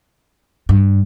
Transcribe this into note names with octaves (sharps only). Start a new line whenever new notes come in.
G2